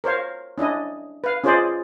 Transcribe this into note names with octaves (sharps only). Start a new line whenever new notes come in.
A#4 C5 C#5 F5
C#4 D4 E4 D#5
B4 F5
C#4 F4 G#4 C5 D5 D#5